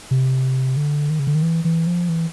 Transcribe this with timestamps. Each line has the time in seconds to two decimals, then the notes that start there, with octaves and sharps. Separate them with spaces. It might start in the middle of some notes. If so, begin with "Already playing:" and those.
0.11 C3
0.77 D3
1.10 D#3
1.19 C#3
1.27 D3
1.35 D#3
1.43 E3
1.65 E3
1.87 F3
2.09 E3